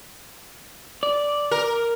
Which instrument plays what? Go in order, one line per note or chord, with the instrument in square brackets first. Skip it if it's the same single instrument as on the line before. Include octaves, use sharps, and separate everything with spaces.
[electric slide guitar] D5
[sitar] A#4